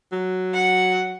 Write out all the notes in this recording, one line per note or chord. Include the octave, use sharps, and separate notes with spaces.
F#3
F#5